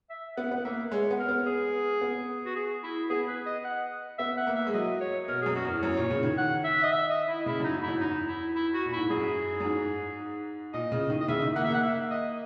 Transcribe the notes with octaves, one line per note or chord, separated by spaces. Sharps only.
E5
B3 F#5
B3
F#5
A#3 E5
G#3 C#5
B3
A#4
B3
G#4
B3
F#4
G#4
E4
B3 G#4
B4
D#5
F#5
B3 E5
F#5
A#3
E5
G#3
F#3 D#5
C#5
B2 A#4
F#2 G#4
F#4
E2 A#4
F#2 C#5
A#2
C#3
D#3
F#5
E5
D#5
E5
D#5
E4
C#3 E4
F#2 D#4
G#2
E4
F#2
E2 D#4
E4
E4
F#4
A#2
G#2 E4
F#2 G#4
F#2
G#2
A#2 D#5
C#3
D#3
D#5
C#3 E5
D#3
A#3 F#5
E5
A#3 F#5
E5
D#5